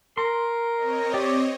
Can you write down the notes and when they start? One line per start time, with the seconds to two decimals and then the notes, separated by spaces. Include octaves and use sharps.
0.18 A#4 C6
0.75 C4 C#5 D#5
1.14 G4 D5